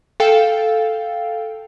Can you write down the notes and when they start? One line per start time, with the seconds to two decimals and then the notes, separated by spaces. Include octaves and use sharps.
0.20 A4 F5 G5